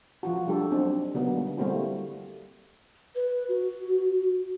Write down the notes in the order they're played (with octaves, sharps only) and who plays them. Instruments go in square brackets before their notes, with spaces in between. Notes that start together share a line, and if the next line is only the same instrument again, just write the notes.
[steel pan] F3 F4 F#4
G3 A3 D4 G4 A4
F#3 C4 D4 D#4
D3 F#3 A#3 B3 D#4
G3
G3 A3 A#3 C4 E4 F#4
[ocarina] B4
F#4